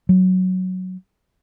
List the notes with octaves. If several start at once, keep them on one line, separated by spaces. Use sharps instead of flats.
F#3